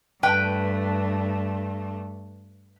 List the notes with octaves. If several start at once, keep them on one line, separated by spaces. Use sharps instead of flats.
G2 A3 B4 G5